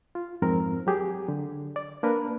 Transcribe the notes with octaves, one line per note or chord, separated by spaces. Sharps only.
F4
F2 G#2 C4 A#4
F#3 G4 G#4
D3
D5
A#3 D4 A#4 B4